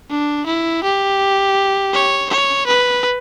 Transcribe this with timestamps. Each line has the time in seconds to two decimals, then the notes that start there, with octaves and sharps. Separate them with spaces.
0.11 D4
0.47 E4
0.84 G4
1.93 C#5
2.30 C#5
2.67 B4